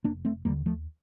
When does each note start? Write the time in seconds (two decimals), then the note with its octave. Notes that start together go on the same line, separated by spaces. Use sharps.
0.04 F1 A#3 D4
0.25 A3 C4
0.45 D#2 G3 A#3
0.49 D3
0.66 F3 A3